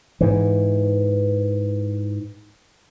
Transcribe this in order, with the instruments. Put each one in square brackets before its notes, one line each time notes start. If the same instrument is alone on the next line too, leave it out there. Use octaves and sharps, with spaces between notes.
[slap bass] G#2 E3